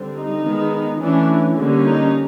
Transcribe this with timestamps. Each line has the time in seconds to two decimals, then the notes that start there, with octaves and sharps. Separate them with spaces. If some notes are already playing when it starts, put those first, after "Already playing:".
Already playing: D3 G3 C4
0.15 D#4
0.44 D#3 G#3 B3
1.00 E3 A3 C#4 D4
1.56 D3 G3 A#3 C#4
1.85 D#4